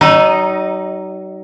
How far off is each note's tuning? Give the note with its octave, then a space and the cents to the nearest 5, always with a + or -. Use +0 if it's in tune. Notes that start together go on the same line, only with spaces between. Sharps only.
F#3 +45 D#4 +0